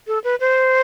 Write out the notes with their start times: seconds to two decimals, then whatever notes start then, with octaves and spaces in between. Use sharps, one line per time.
0.07 A4
0.24 B4
0.40 C5